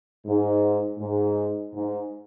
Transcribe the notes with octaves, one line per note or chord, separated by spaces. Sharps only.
G#2
G#2
G#2